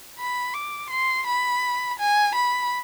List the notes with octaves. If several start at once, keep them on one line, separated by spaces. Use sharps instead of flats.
B5
D6
C6
B5
G#5
B5